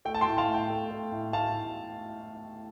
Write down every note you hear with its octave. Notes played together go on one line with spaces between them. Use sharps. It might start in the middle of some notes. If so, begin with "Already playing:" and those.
A3 G5
A5
G5 C6
A2
F5 A5
A2
G5
A3
A3
A2
A2 F5 A5